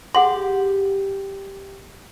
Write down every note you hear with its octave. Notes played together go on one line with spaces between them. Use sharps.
G4 G#4 F#5 C6